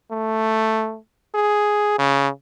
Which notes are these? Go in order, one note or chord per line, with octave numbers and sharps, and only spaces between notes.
A3
G#4
C#3